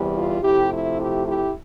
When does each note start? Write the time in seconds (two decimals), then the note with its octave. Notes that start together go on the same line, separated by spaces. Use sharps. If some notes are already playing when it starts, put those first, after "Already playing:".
Already playing: E2 C3 E3 G3
0.13 F4
0.42 C3 F3 A3 E4 G4
0.70 E4
0.98 E4 G4
1.26 E4 G4